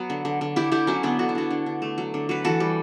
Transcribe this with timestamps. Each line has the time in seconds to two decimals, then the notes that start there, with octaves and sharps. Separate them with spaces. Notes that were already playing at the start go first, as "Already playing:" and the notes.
Already playing: F#3 B3
0.10 D3
0.25 D3
0.41 D3
0.56 D3 E4 G4
0.72 D3 E4 G4
0.87 F#3 C#4 E4
1.03 D3 B3 D4
1.19 D3 F#4
1.29 E4
1.35 D3 D4 F#4
1.50 D3
1.66 D3
1.82 A3
1.98 F#3
2.14 D3
2.29 F#3 B4
2.45 E3 F#4 A4
2.60 G3